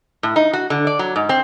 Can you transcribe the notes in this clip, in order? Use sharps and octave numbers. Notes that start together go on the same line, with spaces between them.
A2
D#4
F#4
D3
D5
F#3
G#2
C4